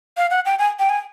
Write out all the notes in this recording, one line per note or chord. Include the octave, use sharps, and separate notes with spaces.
F5
F#5
G5
G#5
G5
G#5